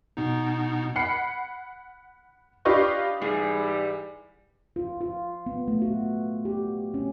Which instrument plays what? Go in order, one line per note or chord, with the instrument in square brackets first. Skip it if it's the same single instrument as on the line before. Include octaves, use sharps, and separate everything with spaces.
[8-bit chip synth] B2 B3 D#4
[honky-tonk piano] F#5 B5 C7 C#7
D4 F4 G4 B4 D#5 C#6
[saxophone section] G#2 E3 G3 [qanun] G#4
[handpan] F4
F4
B3
A3
F#4
G4
C#4